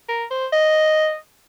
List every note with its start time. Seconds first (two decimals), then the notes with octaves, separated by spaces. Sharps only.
0.09 A#4
0.31 C5
0.53 D#5